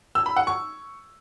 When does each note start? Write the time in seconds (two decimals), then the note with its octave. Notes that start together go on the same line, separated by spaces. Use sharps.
0.15 E6
0.26 B5
0.36 F#5
0.47 C#6